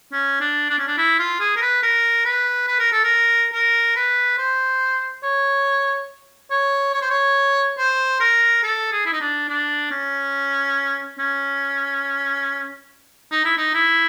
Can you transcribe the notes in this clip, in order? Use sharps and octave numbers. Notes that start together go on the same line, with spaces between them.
C#4
D4
D4
C#4
D4
E4
F4
G#4
A#4
B4
A#4
B4
B4
A#4
A4
A#4
A#4
B4
C5
C#5
C#5
C#5
C5
C#5
C5
A#4
A4
G#4
E4
D#4
D4
D4
C#4
C#4
D#4
E4
D#4
E4